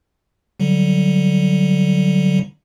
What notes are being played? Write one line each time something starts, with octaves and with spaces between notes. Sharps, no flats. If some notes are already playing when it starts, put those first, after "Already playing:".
D3 F#3 G3